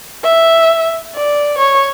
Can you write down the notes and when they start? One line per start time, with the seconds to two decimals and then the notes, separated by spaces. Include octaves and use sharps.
0.23 E5
1.15 D5
1.58 C#5